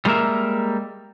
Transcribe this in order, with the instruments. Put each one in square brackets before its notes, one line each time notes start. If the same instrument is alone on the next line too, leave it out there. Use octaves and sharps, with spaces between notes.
[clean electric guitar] G3 G#3 A#3 A#4 E5